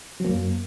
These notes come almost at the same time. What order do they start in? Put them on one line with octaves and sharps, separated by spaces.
F#3 A#3 F#2